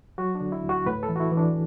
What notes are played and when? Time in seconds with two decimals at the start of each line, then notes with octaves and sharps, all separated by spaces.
0.18 F#3 F#4
0.35 D4
0.41 D3
0.52 E4
0.64 D2
0.69 F#4
0.86 A2 B4
1.03 A4
1.09 E3
1.16 F#4
1.20 E4
1.31 E3
1.37 D4